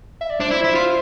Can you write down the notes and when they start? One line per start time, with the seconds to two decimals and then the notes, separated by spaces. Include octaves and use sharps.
0.21 E5
0.30 D5
0.40 D4 C5
0.51 E4
0.64 E4
0.75 F4